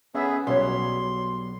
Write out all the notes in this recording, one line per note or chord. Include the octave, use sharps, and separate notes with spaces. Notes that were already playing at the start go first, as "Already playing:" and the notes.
B3 C#4 G#4 E5
B1 G3 F#4 B4 C#5 C6